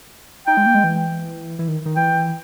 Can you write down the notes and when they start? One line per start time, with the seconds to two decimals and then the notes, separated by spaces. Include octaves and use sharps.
0.47 D#4 G5
0.57 G#3
0.66 A#3
0.75 G#3
0.84 E3
1.59 E3
1.68 D#3
1.86 D#3
1.96 E3 G5